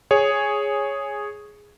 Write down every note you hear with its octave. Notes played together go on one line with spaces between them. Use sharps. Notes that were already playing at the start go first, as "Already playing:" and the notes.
G#4 C#5